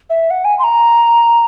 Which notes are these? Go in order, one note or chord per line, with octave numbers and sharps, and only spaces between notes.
E5
F#5
G#5
C6
A#5